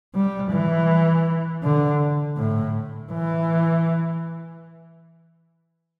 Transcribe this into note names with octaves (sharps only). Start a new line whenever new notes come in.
G3
E3
D3
A2
E3